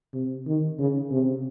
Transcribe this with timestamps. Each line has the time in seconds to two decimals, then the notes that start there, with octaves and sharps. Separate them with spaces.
0.13 C3
0.47 D#3
0.78 C#3
1.11 C3